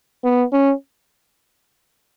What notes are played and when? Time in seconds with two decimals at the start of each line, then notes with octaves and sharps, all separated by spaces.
0.24 B3
0.53 C#4